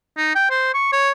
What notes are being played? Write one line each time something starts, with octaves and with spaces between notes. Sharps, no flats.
D#4
G5
C5
C#6
C#5